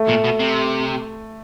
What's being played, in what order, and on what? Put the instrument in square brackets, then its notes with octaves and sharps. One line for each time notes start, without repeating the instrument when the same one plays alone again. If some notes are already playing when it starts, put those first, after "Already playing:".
Already playing: [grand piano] A3
[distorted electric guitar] A#2
B2
C3